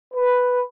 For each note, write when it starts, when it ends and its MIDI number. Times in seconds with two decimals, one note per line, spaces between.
0.14 0.60 71